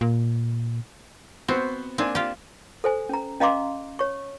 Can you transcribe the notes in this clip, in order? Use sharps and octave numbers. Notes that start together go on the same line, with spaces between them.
A#2
B3 C4 F#4 C5
A#3 C4 D4 G#5
F4 G4
A4 C5 G#5
C#4 A#5
C#4 D#5 F5 A#5 C6 D6
C#5 C#6